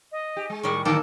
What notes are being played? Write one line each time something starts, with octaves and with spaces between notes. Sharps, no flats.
D#5
G4
G#3
A2 D#3 G3 C#6
D3 D#3 F#3 A#3 A4 D6